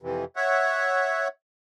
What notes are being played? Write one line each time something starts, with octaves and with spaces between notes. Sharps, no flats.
F2 C3 E3
C#5 E5 F#5